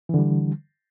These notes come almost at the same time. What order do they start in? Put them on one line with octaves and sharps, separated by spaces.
E3 D3 G3